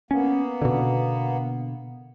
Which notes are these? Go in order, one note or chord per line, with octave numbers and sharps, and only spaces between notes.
A#3 B3 C#4
B2 D3